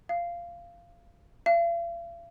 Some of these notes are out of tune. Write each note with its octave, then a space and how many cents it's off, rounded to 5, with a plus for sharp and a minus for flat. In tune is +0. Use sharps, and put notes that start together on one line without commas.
F5 -15
F5 -45